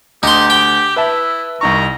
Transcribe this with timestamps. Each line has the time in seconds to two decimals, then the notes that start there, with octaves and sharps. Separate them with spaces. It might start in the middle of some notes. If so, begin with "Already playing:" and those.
0.23 D2 D#4 G4 C6
0.50 G5
0.96 E4 B4 E5 A5
1.61 C2 D#4 A#5 C#6